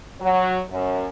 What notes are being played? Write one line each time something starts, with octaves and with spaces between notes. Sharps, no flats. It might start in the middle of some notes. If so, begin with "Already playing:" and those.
F#3
F#2